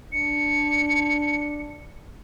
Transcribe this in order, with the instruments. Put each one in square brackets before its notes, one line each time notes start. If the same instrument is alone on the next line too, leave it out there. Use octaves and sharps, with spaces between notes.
[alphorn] D4 [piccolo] C#7